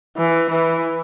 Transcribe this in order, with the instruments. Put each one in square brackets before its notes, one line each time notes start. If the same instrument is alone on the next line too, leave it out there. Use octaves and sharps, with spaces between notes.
[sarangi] E3
E3